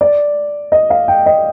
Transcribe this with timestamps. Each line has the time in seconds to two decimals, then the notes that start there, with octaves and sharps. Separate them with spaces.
0.01 D5
0.72 D#5
0.90 F5
1.08 G5
1.26 D#5